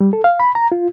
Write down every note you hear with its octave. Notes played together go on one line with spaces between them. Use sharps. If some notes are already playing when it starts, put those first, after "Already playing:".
G3
A4
F5
B5
A#5
F4